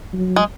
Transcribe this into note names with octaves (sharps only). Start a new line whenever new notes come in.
F#3
G#3